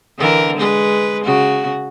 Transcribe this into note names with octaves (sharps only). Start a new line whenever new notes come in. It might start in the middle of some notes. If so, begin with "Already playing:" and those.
D3 E3 A#4
G#3 B4
C#3 F#4